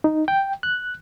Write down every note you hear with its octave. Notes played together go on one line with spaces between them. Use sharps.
D#4
G5
F#6